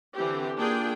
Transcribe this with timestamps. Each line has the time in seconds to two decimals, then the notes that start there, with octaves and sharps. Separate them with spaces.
0.14 D3 E3 C4 G4
0.57 A#3 D4 F4 G#4 G5